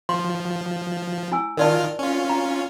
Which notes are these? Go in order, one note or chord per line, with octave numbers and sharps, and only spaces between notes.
F3 C6
E4 G#5 E6
D#3 F4 A#4 D5 A5 F6
C#4 F4
A#5